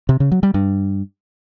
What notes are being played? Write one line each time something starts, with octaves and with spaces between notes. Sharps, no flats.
C3
C#3
F#3
G3
G2